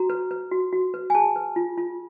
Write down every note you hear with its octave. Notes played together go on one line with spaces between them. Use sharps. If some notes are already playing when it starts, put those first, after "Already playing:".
Already playing: F#4 A#5
B4
B4
F#4
F#4
B4
G#5
G#4 A5
B4
F4
F4